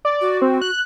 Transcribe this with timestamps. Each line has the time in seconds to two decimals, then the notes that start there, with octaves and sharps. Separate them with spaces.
0.05 D5
0.21 F#4
0.42 C4
0.62 F#6